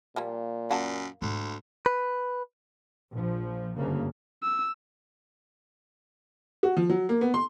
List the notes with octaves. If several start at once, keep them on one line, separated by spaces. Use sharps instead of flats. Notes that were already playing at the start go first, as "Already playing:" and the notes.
A#2 F3 G3 A#3
F#2 A#3 F#4 A5
D2 G#2 B3
B4
A#1 F3
F#1 D2 G2 C#3 A#3
E6
F#4
F3
F#3
A#3
B3
C6